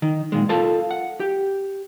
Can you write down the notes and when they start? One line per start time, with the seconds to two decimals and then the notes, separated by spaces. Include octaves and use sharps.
0.02 D#3
0.32 A#2 D#3 G#3
0.49 F4 A4 A#4 F5 A5
0.91 F#5
1.20 G4